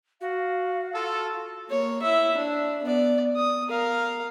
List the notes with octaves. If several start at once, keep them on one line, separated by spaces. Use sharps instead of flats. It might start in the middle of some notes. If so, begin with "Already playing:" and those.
F#4 F5
F4 A4
A#3 C#5
E4 E5
D4
B3 D5
D#6
A#4 F5